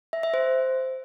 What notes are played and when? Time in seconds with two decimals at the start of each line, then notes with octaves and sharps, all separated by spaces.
0.13 E5
0.23 E5
0.34 C5